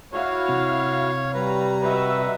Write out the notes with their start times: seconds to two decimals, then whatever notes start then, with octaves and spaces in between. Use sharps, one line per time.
0.13 E4 F#4 C#5 F5
0.49 C3
1.34 G3 B4 A#5
1.82 F#4 B4 D#5 E5